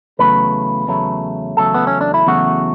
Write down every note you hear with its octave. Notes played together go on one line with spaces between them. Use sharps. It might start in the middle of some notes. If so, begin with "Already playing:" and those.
E2 C#3 F#3 A3 B4
E2 C#3 F#3 A3
E2 C#3 F#3 A3 A4
B3
C#4
D4
E4
E2 C#3 F#3 A3 F#4